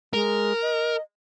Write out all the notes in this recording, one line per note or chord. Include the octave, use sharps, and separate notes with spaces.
G#3 A#4
D#5